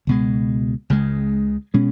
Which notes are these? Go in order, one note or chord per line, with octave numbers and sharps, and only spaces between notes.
C#2 B2 G#3
C#2 C#3 G#3
B2 G#3 C#4